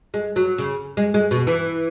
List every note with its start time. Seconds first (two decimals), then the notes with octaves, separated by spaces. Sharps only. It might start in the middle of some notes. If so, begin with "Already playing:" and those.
0.14 G#3
0.36 F#3
0.58 C#3
0.97 G#3
1.14 G#3
1.31 B2
1.47 E3